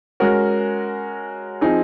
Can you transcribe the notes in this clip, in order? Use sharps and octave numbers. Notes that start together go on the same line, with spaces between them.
G#3 C#4 F#4 A#4
F3 C4 D#4 G#4